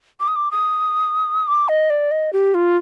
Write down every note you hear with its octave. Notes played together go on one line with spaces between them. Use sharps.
D6
D#6
D6
D#6
D6
D#5
D5
D#5
G4
F4